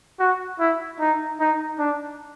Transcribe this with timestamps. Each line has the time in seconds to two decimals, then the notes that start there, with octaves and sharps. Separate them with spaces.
0.20 F#4
0.60 E4
1.00 D#4
1.40 D#4
1.79 D4